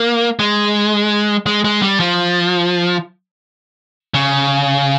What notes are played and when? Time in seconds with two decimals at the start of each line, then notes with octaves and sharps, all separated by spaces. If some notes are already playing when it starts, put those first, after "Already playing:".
Already playing: A#3
0.39 G#3
1.46 G#3
1.64 G#3
1.82 G3
2.00 F3
4.14 C#3